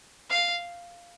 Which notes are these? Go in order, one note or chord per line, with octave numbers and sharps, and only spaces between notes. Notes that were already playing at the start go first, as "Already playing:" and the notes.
F5